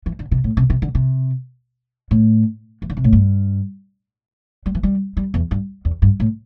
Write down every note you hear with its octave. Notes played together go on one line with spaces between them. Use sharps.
E3
D3
C3
A2
C3
C3
D3
C3
A2
E3
D3
C3
A2
G2
G3
E3
G3
G3
E2
G2
E2
G2
A2